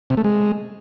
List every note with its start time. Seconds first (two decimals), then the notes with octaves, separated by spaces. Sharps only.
0.10 C3
0.17 A3
0.24 G#3